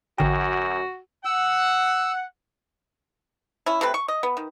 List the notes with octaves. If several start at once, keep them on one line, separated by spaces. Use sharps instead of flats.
A1 F#2 D3 F#4 G5
F#5 E6
C#4 E4
C3 A3 C4 B4
C#6
D#5
B3
D#3